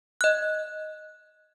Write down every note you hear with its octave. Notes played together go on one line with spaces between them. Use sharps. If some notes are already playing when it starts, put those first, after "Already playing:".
D#5 F#6